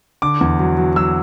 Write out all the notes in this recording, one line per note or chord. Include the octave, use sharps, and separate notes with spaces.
D3 D6
E2
F#3
F#3
F#3 E6